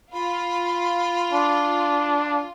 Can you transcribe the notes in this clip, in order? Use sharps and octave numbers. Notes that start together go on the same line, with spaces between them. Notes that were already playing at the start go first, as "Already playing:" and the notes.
F4 B5
D4